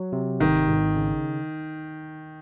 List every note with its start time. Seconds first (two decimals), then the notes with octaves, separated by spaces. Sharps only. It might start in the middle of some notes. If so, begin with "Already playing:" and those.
Already playing: F#3
0.13 C3
0.40 G#1 D#3
0.67 G#1
0.96 C#3